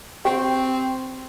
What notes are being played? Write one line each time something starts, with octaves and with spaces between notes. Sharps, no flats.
C4 G4 G5